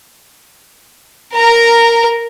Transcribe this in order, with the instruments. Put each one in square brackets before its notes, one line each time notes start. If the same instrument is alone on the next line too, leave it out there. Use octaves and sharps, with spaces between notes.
[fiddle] A#4 A#5